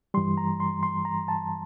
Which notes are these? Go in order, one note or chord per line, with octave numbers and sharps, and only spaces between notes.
G2 E3 G3 C6
A#5
C6
C6
A#5
A5